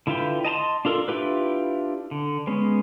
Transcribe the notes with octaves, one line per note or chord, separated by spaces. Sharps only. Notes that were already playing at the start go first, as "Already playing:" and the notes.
D3 E4 F4 B4 G5
D#5 A5 A#5 C6
D4 F4 A4 A#4
D4 E4 F4 G4 B4
D3
G#3 B3 C#4